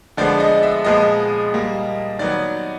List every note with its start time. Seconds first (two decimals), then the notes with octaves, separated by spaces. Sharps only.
0.17 D3 F3 G#3 B3 D5
0.40 D#5
0.63 E5
0.84 A#2 F3 G#3 B3 D#5
1.53 A#2 G3 A#3
2.19 D#3 F#3 B3 D5